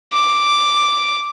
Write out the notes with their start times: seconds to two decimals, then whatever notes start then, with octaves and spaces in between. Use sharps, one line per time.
0.13 D6